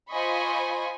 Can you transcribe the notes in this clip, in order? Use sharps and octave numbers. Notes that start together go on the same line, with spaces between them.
F4 C5 D#5 G#5 B5 C#6